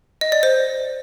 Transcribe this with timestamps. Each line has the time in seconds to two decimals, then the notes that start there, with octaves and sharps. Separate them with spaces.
0.21 D#5
0.32 D5
0.43 C5